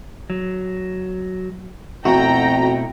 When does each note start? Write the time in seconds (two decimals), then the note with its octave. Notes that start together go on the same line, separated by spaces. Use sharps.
0.30 F#3
2.05 F2 B2 A3 E4 F#4 G5 A#5